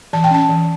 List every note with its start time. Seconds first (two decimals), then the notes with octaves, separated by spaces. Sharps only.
0.13 E3 A5
0.24 G5
0.31 C#4 A5
0.49 E3